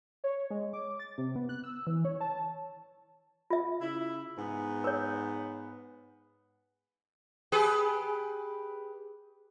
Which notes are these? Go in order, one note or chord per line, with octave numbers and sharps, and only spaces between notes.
C#5
G#3
D6
A6
C3
B3
F#6
E6
E3
C#5
A5
F4 E5
C#3 E4
G#2 B3
A#4 C#5
G4 G#4 B4